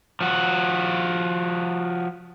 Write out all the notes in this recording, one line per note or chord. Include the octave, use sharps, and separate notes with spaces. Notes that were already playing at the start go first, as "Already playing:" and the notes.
F3 F#4